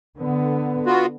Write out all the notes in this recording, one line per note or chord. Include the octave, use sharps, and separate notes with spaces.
D3 B3
B3 F4 F#4